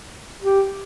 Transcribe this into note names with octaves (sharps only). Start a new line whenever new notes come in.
G4